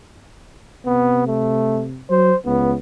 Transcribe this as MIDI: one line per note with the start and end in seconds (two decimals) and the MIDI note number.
0.86 2.01 48
0.86 1.26 59
1.27 1.85 57
2.10 2.32 54
2.10 2.36 72
2.46 2.74 37
2.46 2.75 59